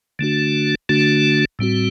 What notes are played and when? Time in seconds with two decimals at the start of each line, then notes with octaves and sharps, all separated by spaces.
0.19 D3 A3 D4 F#4
0.89 D3 A3 D4 F#4
1.59 A2 G3 C4 F#4